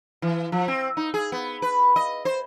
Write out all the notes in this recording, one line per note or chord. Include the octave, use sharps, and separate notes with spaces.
E3
F3
C4
D#4
G#4
B3
B4
D#5
C5